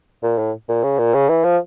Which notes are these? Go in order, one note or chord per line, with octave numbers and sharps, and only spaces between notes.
A#2
A2
A#2
C#3
A#2
C#3
E3
F3